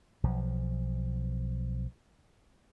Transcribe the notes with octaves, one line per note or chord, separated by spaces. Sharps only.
B1 F3